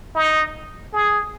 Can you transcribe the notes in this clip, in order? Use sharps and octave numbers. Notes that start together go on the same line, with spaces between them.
D#4
G#4